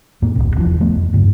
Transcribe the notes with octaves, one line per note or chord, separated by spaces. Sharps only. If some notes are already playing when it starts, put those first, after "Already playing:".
F2 A2 A#3
D#1 C2 C3
F1 E2 E3 F3
F3 A3 B3
F2
D2 G2 C#3